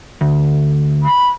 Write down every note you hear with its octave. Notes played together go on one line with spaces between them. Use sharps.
D2
B5